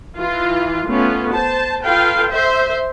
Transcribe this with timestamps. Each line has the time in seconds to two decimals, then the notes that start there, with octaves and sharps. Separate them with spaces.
0.18 E3 F4
0.89 A3 B3 C#4 F4
1.33 C5 A5
1.85 F4 A4 B4 F5 G5
2.31 C5 E5